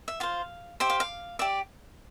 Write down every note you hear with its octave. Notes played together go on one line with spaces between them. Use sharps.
E5
F4 C5 F5
G4 C5 E5
F5
F5
G4 D5 E5